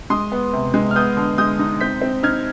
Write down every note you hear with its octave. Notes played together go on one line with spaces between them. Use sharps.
G#3 C6 D#6
B3
C3
G#3
F6
B3 D#6 G6
D3
G#3 D#6 G6
D#4
C4 G6 B6
C4
D#4 F6 G#6